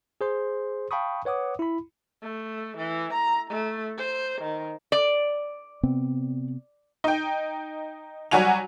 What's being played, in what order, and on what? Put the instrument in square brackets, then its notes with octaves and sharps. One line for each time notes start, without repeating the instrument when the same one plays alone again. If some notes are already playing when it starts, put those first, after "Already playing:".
[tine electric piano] G#4 C5 C6
F5 G5 A5 B5 C#6 D#6
B4 C#5 F#5 D6 D#6
E4 B5
[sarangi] A3
E3
A#5
A3
C5
D#3
[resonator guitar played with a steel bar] D5
[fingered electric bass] C3 B3 C4
[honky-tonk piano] D#4 G5
F#3 G3 F#4 G#5 F7